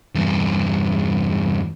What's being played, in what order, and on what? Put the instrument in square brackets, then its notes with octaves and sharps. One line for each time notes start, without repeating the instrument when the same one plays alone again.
[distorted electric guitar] E2 G2